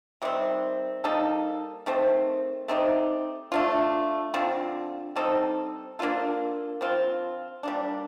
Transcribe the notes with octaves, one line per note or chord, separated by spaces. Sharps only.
C3 D#3 G3 C4
G3 A#3 D#4 A4
D#3 A3 C4
A3 C4 D#4 G4
A3 D4 F4
D3 F3 C4
G3 C4 D#4 A4
A#3 D4 F4 A4
F3 C4 F4
G3 A#3 D4